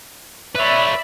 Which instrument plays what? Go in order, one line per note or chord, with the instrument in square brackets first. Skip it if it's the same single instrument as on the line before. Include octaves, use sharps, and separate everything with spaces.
[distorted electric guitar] B4 C#5 [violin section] D5 E5 B5